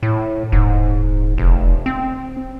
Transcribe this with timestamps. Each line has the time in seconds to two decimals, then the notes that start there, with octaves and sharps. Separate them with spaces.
0.03 A2
0.52 D#1 G#2
1.38 F1
1.86 C4